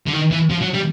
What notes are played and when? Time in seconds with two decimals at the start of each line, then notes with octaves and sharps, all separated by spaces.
0.06 D3
0.13 D#3
0.31 E3
0.50 F3
0.61 F#3
0.74 G3